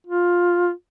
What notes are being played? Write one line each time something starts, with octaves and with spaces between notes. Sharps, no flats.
F4